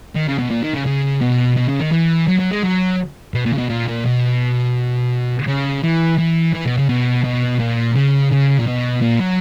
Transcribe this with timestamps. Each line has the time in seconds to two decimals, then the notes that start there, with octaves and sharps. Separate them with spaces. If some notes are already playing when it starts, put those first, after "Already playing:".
0.15 D#3
0.27 C#3
0.38 B2
0.50 A#2
0.62 D#3
0.74 C#3
0.86 C#3
1.21 B2
1.57 B2
1.69 C#3
1.80 D#3
1.92 E3
2.28 F#3
2.40 F#3
2.51 G#3
2.63 F#3
3.34 B2
3.46 A#2
3.53 C#3
3.58 B2
3.69 A#2
3.88 A#2
4.05 B2
5.47 C#3
5.83 E3
6.18 E3
6.54 E3
6.66 B2
6.78 C#3
6.89 B2
7.24 B2
7.60 A#2
7.95 C#3
8.31 C#3
8.59 A#2
8.67 B2
9.02 A#2
9.20 F#3